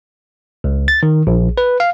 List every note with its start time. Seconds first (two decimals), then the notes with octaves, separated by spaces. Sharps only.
0.64 C#2
0.88 A6
1.03 D#3
1.27 A#1
1.58 B4
1.80 F5